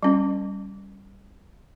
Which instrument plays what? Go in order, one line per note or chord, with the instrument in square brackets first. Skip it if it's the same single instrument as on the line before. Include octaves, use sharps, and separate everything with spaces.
[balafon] G3 C#4